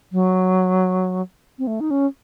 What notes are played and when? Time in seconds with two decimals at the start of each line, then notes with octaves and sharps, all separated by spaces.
0.12 F#3
1.59 C4
1.67 A3
1.80 D#4
1.91 C#4